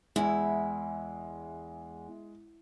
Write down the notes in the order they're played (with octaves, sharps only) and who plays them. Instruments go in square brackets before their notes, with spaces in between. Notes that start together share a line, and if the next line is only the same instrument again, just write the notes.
[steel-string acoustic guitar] E2 [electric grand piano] G#3 [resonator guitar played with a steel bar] E4